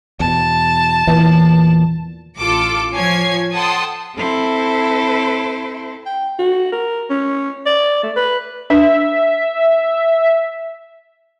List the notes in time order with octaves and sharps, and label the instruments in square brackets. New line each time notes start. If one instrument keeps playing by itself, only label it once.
[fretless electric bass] E2 B2 [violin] A5
[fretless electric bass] E2 A#2 [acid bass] E3
[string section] A1 F4 A4 D6
F3 C#5 G#5 G#6 C7
A4 F#5 G5 A5 C6 D#6
[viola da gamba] C4 A4 [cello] E4 C5
[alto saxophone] G5
F#4
A#4
C#4
D5
A3
B4
[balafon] D4 B4 [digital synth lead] E5